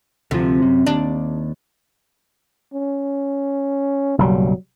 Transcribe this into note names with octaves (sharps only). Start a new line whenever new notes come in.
D2 C3 F3
F#2
D#2 D4
C#4
F#1 B1 F#3 G3